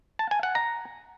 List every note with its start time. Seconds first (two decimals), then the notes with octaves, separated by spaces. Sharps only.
0.19 A5
0.31 G#5
0.43 F#5
0.55 A#5